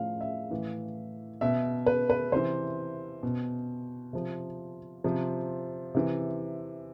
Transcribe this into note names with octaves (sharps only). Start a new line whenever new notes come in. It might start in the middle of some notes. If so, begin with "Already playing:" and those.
Already playing: A2 F3 F5
E5
A2 E3
B2 E5
B4
B4
C3 E3 C5
B2
C3 F3
C3 F3
C3 E3